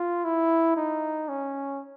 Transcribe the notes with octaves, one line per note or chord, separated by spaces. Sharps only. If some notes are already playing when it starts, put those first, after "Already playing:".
Already playing: F4
E4
D#4
C#4